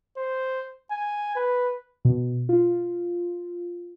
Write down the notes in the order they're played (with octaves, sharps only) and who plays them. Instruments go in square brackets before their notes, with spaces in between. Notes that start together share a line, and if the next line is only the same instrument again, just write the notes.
[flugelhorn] C5
G#5
B4
[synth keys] B2
F4